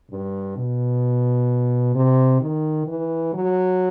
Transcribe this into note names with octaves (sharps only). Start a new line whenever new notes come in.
G2
B2
C3
D#3
E3
F#3